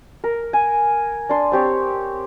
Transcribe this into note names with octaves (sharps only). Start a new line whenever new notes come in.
A#4
G#5
D4 C6
C4 G4 C#5